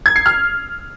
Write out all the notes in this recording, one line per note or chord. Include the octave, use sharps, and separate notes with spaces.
G#6
C7
F6